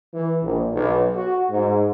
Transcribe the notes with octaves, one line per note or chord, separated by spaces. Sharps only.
E3
A#1
B1
F#4
G#2